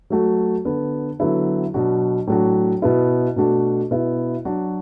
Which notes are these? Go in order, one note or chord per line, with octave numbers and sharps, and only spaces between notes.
F#3 A3 F#4
D3 B3 D4
D3 F#3 B3 E4
B2 F#3 D4 F#4
A2 F#3 D4 F#4
B2 B3 E4
B2 A3 D4 F#4
B2 B3 E4
F#3 D4 F#4